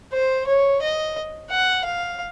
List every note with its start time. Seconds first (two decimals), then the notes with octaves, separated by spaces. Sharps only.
0.13 C5
0.47 C#5
0.82 D#5
1.51 F#5
1.85 F5